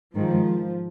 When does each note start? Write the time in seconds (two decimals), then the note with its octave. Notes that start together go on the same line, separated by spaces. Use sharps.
0.15 G#2 D#3 F3